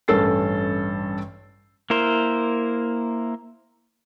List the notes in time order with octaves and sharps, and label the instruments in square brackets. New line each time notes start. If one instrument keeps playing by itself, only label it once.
[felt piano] A1 G2 C#4 A4 A6 C7
[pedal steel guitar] A#3 E4 A#4 C5